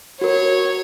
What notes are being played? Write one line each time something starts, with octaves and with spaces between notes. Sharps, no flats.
F#4 A#4 C#5